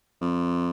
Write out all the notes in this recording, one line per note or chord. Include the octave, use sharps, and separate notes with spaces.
F2